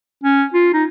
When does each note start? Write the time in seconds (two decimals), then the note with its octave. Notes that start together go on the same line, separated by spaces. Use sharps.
0.24 C#4
0.54 F4
0.73 D#4